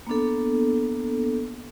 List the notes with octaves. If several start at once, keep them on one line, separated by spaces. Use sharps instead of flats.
A#3 B3 D4 A4